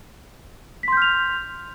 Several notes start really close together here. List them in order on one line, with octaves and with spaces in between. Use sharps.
B6 C6 G6 F6 F7